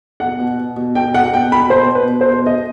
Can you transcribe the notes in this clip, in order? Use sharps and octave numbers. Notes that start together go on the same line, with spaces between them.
B2 F#5
B2
B2
B2
B2 G5
B2 F#5
B2 G5
B2 B5
B2 C5
B2
B4
B2
C5
B2
B2 D#5